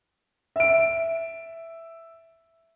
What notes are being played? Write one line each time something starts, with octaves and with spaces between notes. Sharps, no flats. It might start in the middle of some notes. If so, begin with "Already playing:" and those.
E5 D7